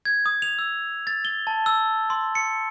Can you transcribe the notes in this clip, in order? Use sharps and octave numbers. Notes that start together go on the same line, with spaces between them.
G#6
D#6
F7
E6
A6
G7
A5
E6
C6
C#7